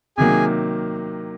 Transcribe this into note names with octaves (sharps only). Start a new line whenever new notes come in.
C3 D#3 F#3 A#3 G#4 G#5